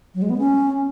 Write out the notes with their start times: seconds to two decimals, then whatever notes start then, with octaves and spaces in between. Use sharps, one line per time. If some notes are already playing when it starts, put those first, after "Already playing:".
0.15 F#3
0.22 G#3
0.30 B3
0.38 C#4